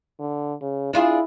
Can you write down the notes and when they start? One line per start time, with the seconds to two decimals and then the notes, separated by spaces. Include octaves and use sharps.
0.19 D3
0.62 C#3
0.93 D4 E4 F4 G#4